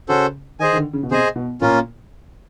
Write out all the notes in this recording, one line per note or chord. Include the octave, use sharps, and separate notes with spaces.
C#3 C#4 F#4 A4 C5
D#3 G#4 C5 D#5 G#5
D#3
D3
C#3
B2
C3 G#4 C5 D#5 G#5
B2
A#2 A#3 C#4 F4